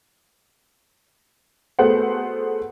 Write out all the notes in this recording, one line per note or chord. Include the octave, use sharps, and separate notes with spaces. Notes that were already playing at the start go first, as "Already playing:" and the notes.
A3 B3 F#4 G#4 C5 F#5